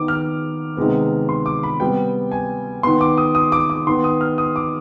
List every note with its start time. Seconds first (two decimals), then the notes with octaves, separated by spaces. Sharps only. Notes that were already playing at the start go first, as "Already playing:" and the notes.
Already playing: D#3 B3 D6
0.08 F6
0.77 C3 D#3 G#3 B3
1.29 C6
1.46 D6
1.63 B5
1.80 C3 G3 B3 G5
2.32 G#5
2.83 D#3 B3 C6
3.01 D6
3.18 D#6
3.35 D#6
3.52 D6
3.70 D6
3.87 D#3 B3 C6
4.04 D#6
4.21 F6
4.38 D#6
4.56 D6